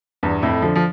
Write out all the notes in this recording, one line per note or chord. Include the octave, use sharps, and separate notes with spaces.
E2 G2
F2 A2
D3 F3
F3